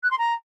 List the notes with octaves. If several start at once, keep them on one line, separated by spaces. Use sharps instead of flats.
F#6
C6
A#5